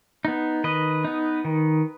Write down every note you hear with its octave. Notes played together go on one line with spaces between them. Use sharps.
B3 D#4
D#3 B4 D#5
B3 D#4
D#3